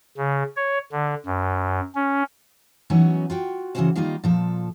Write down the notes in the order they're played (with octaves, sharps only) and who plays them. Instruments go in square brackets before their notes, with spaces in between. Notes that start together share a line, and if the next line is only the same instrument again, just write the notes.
[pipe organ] C#3
C#5
D3
F#2
C#4
[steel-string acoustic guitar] E3 F#3 B3 C#4 D#4 F#4
F4 F#4 G5
C#3 E3 F#3 C#4 F#4 C5
D#3 G3 A#3 D#4 F4
A#2 F3 A4